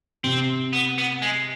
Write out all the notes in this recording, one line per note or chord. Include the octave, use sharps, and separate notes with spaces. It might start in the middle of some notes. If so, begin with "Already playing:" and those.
C3 C4
B3
B3
G#3